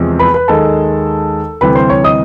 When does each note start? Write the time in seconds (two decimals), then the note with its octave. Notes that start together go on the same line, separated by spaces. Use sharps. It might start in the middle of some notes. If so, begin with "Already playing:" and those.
Already playing: E2 C3 F3 G#3
0.19 B4 B5
0.34 B4 B5
0.48 D#2 D#3 G#3 A4 A5
1.61 D2 C3 E3 G3 B4 B5
1.75 C5 C6
1.89 C#5 C#6
2.04 D#5 D#6